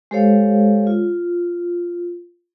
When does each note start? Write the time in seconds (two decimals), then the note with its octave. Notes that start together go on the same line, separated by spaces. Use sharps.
0.11 G#3 G4 A4 C5 C#5 F5
0.87 F4